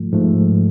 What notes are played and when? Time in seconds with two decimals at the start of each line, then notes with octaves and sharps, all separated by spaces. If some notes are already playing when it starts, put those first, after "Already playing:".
Already playing: G#2 F3 A3
0.13 G#2 F3 A3